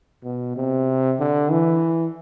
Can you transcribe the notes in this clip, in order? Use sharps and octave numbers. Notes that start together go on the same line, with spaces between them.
B2
C3
D3
E3